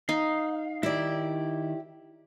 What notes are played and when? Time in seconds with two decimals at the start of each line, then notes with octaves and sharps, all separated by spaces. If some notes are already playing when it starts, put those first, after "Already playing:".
0.09 D#4 F5
0.83 D#3 E4 G4 D5 E5